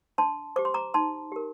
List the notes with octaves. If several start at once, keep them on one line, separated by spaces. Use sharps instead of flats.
D4 A5 C6
G4 C5 D6
C6
A#5 D6
D#4 A5 C6
G4 A#4